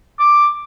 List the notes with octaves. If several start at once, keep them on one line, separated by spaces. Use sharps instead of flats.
D6